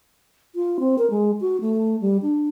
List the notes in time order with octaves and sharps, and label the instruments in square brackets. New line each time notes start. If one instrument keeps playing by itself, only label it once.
[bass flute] F4
C4
A#4
G#3
F#4
A3
G3
D4